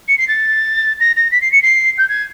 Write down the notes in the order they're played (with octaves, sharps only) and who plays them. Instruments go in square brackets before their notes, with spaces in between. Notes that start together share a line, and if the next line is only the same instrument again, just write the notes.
[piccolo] C#7
C7
A6
A#6
A#6
B6
C7
C#7
C7
G6
G#6